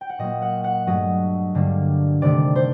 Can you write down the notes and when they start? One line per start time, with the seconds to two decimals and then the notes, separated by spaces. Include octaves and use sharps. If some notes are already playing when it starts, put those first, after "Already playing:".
0.01 G5
0.09 F#5
0.19 A#2 F#3 A#3 D#5
0.42 F#5
0.64 F#5
0.87 G2 F#3 A3 D#5
1.55 G2 D3 G3 A#3
2.22 C3 D#3 A3 D5
2.56 C5